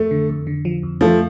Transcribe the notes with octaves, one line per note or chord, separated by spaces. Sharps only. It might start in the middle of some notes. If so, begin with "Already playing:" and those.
Already playing: F2 A3
D3
F2
D3
F3
F2
F2 F3 A3